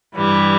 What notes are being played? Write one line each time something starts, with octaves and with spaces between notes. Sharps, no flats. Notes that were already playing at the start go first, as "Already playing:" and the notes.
G2 E3 G3